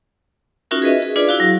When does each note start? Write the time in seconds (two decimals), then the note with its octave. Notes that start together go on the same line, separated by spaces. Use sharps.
0.71 C#4 D#4 F4 F#4 A#4 E5
0.82 G#4 B4 D#5 E5
1.02 G#4
1.16 D4 F4 G#4 B4 D5
1.27 E4 F#4 F5
1.40 F#3